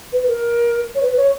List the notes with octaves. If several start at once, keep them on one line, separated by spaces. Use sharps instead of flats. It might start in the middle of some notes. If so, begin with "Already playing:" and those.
B4
A#4
C#5
B4
C#5